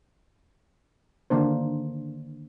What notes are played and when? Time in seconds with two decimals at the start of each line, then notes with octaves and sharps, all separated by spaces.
1.30 D3 D#3 A#3 D4 C5